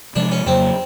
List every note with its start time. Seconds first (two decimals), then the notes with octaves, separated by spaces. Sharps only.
0.16 C3 F3 G#3 D4
0.32 C#4
0.46 F2 C#3 F#3 A#3 C4